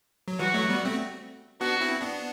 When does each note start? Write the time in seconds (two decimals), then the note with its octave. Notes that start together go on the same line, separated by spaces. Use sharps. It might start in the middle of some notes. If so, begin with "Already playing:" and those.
0.28 F#3
0.39 E3 G3 F#4
0.54 F#3 A3
0.69 G3 B3
0.85 A3 C4
1.61 B3 D4 F#4
1.81 C4 E4
2.01 B3 D4